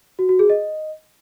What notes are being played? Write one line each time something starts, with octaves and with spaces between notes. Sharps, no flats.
F#4
F#4
G#4
D#5